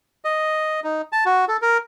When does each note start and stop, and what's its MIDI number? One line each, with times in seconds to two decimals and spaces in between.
0.25 0.80 75
0.84 1.02 63
1.12 1.24 81
1.26 1.45 66
1.48 1.57 69
1.62 1.78 70